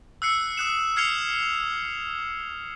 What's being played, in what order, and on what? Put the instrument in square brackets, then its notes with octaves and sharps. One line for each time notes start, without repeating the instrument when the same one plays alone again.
[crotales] E6 F#6 C7 C#7
D#6 F#6 E7
F6 G#6 C7 C#7 F7 G7